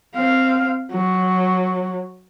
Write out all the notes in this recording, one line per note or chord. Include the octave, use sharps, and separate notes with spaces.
C4 F5
F#3